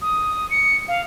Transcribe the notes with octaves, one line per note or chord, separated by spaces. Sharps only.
D#6
C#7
F5